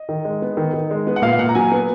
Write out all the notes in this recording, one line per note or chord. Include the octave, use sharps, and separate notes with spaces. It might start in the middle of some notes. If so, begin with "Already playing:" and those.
Already playing: D#5
D#3
G#3
B3
D#3
D#3
G#3
B3
F#5
A#2 F5
A#2 F#5
A#5
F#3 G#5
B3